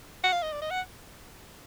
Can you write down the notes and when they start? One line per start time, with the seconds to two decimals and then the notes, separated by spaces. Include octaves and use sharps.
0.24 F#5
0.33 F5
0.43 D#5
0.53 D5
0.62 D#5
0.71 F#5